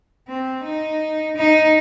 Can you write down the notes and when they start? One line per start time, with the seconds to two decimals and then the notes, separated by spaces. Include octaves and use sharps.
0.28 C4
0.64 D#4
1.36 D#4